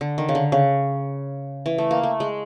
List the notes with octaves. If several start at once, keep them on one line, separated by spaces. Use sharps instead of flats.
D3
D#3
C#3
D3
C#3
E3
A3
A#3
A3
G#3